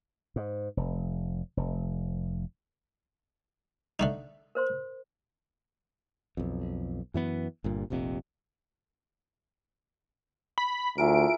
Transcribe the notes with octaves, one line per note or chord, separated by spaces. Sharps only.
G#2
F1
F1
D3 A3 D#4
A#4 C5 C6
B1 F2
F#2 E3 B3
G1 G2 A#2
F1 A#1 F2 C3
B5
D2 E4 F4 G#4 A#4 D7